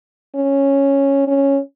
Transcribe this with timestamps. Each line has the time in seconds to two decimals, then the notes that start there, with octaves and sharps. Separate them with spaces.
0.35 C#4
1.27 C#4